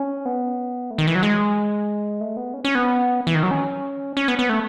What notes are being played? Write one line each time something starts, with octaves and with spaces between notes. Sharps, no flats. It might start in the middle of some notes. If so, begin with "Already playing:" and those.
Already playing: C#4
B3
A3
D#3
E3
F#3
G#3
A3
B3
C#4
C#4
B3
E3
D#3
F#3
C#4
C#4
B3
B3
A3